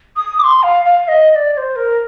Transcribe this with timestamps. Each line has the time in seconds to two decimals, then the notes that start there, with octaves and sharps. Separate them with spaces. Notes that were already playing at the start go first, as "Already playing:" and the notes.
0.16 D#6
0.39 D6
0.44 C6
0.63 F5
0.85 F5
1.08 D#5
1.31 D#5
1.35 D5
1.53 D5
1.57 C5
1.76 A#4